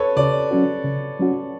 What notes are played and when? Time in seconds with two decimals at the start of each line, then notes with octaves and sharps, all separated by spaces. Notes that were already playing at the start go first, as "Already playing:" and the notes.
Already playing: A4 B4 C#5
0.16 C#3 D5
0.51 F#3 C#4 F#4
0.84 C#3
1.20 F#3 C#4 F#4